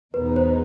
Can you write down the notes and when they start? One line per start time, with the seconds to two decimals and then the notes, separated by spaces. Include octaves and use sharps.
0.14 E2 B2 G#3 B3 D#4 B4
0.36 C5